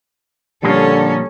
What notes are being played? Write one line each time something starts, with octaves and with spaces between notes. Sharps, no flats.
A#2 D3 F3 G3 A#3 C#4 A4